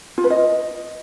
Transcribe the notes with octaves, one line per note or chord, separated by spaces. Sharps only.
F4
B4
D#5